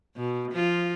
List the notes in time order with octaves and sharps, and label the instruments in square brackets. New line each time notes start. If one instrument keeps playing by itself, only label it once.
[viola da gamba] B2
F3 F4